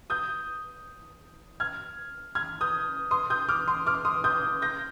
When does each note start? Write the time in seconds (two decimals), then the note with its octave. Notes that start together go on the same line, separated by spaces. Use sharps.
0.10 D#6 G6
1.60 F6 G#6
2.35 F6 G#6
2.61 D#6 G6
3.11 C6 D#6
3.30 D#6 G6
3.49 D6 F6
3.68 C6 D#6
3.86 D6 F6
4.05 C6 D#6
4.24 D#6 G6
4.62 G6 A#6